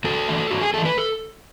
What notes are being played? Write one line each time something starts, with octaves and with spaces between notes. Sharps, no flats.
G#2 F#4 A4
E3 A3
G#2 F#4
G#4
E3 A3 A4
B4
A4